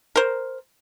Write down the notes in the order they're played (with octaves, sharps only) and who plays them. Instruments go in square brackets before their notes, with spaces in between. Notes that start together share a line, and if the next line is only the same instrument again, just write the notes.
[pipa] A#4 C5